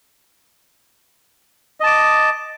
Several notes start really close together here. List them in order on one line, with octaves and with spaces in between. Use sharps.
D#5 A5 D6